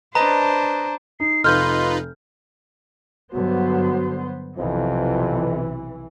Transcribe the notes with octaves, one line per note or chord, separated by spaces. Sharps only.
D4 B4 C5 D#5 A5 A#5
D#4 C7
F1 D#4 F4 B4 C6 F6 G6
G2 D3 F#3 B3 F#4 C5
B1 F2 C3 E3 F3